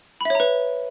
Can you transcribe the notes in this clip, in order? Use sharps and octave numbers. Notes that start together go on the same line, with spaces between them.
B4 C#5 E5 A#5 B5